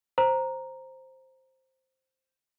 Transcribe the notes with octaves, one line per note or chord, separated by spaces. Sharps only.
C5 A#5